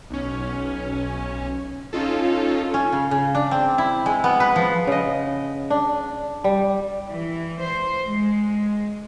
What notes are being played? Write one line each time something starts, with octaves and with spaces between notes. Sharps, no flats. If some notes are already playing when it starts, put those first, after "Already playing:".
B1 C#4
C#4 D#4 F4 A4
C#4
C#3
C#3
D4
C4
E4
G#3
B3
B4
F3
C#3 D#5
D4
G3
E3
C5
G#3